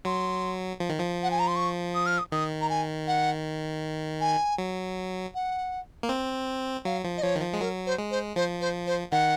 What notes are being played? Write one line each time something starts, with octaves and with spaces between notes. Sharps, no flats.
F#3 C6
F3
D#3
F3
F#5
G#5
A#5
C6
C#6
D#6
F6
D#6
D#3 D#6
A#5
G#5
F#5
G#5
F#3
F#5
A#3
C4
F#3 F5
F3
D#5
F3 C#5
D#3
F3
G#3
F#3 A#4
C5
G#3
C5
F3 C5
C5
C5
D#3 F#5